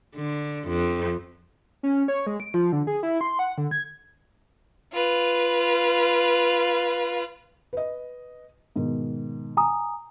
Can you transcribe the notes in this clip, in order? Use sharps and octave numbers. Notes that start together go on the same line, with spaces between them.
D3
F2
C#4
C#5
G#3
D7
F3
D3
G#4
E4
C6
F#5
D3
G#6
F4 B4
B4 D#5
G#2 B2 D#3
G#5 A#5 D#6